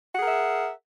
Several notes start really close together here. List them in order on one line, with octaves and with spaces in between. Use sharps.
F#5 G#4 A#4 E5